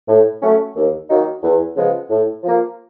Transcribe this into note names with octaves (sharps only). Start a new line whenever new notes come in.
A2
F#3 A3 C#4
D#2
D#3 F#3 A#3 D#4
E2
C#3 F3 G#3 B3
A2
F3 A#3